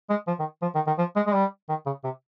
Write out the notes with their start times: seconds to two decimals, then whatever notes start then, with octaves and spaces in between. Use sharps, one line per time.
0.10 G#3
0.28 F3
0.39 D#3
0.62 F3
0.75 D#3
0.87 D#3
0.99 F3
1.16 G#3
1.27 G#3
1.34 G3
1.69 D#3
1.86 C#3
2.04 C3